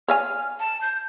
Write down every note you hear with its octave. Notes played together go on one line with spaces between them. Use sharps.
C#5 F5 G#5 F6
A5
G6